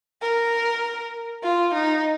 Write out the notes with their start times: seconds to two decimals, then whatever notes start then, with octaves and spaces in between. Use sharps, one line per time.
0.22 A#4
1.43 F4
1.74 D#4